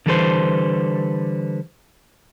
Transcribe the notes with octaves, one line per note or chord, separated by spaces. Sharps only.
D3 E3 G3 A4 B4 C5